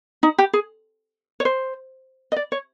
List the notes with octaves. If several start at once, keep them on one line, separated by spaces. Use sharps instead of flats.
D#4
G4
G#4
C#5
C5
D#5
D5
C#5